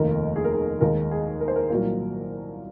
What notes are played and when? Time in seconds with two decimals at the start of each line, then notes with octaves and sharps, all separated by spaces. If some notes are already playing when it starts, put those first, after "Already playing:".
Already playing: F1 D#2 D#3 A#3 A#4
0.36 G#4
0.44 A#4
0.53 G#4
0.80 D#2 D#3 G#3 A#4
1.11 G#4
1.41 A#4
1.48 C5
1.56 A#4
1.70 C2 A#2 F#3 A#3